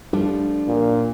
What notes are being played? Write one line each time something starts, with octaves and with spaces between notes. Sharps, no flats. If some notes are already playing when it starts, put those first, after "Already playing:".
F3 G3 A3 D4
A#2